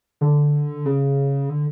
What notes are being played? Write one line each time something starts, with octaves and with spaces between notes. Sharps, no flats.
D3
C#3
D3